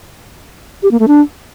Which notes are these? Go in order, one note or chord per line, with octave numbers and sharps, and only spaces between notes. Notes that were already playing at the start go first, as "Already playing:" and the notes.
G4
A#3
A3
D4